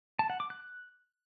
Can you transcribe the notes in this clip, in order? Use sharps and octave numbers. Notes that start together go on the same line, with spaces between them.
A5
F#5
D6
F#6